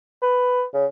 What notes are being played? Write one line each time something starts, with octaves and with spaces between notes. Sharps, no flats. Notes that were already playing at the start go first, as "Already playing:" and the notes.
B4
C#3